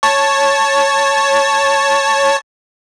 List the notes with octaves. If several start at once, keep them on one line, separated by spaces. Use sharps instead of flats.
C#5 A5